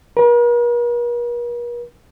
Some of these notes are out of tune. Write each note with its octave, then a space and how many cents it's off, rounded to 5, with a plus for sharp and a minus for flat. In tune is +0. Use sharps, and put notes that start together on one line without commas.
A#4 +45